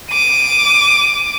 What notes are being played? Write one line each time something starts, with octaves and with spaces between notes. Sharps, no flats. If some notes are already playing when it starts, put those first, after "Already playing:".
D6 D#7